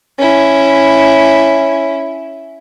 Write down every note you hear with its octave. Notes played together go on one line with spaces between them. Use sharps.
C#4 E4